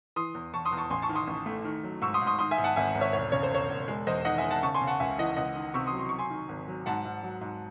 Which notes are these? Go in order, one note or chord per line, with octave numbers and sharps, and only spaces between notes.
E3 C6 D#6
E2
E2 A5 C#6
C6 D#6
E2
A5 C#6
A1 G#5 C6
A5 C#6
D#3
C6 D#6
A1
A3
D#3
F#3
G#2 C#6 E6
C6 D#6
G#2
C6 D#6
D#3 C6 D#6
E5 G#5
G#2
F#5 A5
G#1 E5 G#5
G#1
C#5 E5
E1 C#5
C#3 C#5
C5
E1 C#5
E1
G#3
E2 C5 D#5
D#3 D#5 F#5
E5 G#5
D#3
F#5 A5
C#3 A5 C#6
G#5 C6
C#3
F#5 A5
C#2 E5 G#5
E3 D#5 F#5
C#2 D#5 F#5
D#3
C3 C#6 E6
C6 D#6
F#3
C6
F#3 C#6
G#5 C6
D#3
G#1
F#3
G#2 F#5 A5
G#2
F#3
G#2